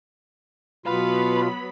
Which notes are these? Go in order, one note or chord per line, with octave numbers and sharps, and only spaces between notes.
B2 F#3 B3 F4 B4 F5 B5